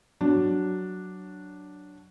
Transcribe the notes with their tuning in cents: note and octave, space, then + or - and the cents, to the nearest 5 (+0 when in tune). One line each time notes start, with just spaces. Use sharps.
F#3 +10 D4 +0